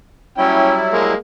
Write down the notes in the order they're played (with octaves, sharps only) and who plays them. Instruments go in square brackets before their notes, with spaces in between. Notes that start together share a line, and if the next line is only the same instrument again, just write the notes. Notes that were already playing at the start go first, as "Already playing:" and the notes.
[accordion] F#3 G3 E4 [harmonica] C#4 G5
[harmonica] G#3 A#3